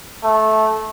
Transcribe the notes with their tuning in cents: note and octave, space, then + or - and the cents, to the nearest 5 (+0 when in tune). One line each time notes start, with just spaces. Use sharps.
A3 -15